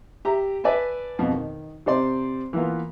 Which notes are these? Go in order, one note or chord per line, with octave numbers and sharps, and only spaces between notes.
G4 E5 A#5
B4 D5 E5 G#5 A5
F2 B2
D#3
C3 C5 D5 C6
E3 A#3 B3 F4